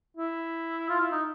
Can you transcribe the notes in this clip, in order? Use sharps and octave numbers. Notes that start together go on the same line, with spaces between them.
E4
F4
E4
D#4